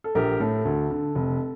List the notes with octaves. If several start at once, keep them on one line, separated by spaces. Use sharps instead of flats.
A4
A#1 G4 A#4
A2 A4
D2
D3
F1